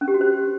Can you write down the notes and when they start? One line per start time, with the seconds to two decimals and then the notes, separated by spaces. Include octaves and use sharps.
0.01 C#4
0.08 G4
0.14 F#4
0.21 C5